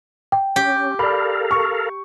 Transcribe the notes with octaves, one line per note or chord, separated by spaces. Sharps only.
G5
C#4 G4
A4 A#4 D5 F5 B5
C#6